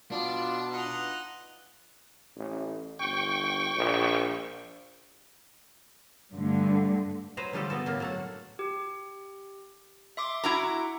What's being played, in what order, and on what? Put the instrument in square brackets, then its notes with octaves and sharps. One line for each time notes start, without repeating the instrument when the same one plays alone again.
[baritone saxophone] B2 [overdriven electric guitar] D4 [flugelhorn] F4 [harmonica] D5
[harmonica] D#4 F4 F#5 [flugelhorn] B4
[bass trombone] A1
[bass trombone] G1 [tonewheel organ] G5 C#6
[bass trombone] A#1
[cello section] G2 D3 A3
[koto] F#3 B4 C5 A#5
D3 F3 G3 A3 G4 A4
B3 F#4 A4
A2 A#3
F#3 A3 F#5
[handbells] G4
E5 C6 D6
[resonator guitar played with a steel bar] E4 F#4 A#5